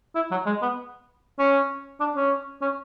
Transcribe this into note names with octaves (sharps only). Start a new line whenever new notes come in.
E4
F#3
G#3
B3
C#4
D4
C#4
C#4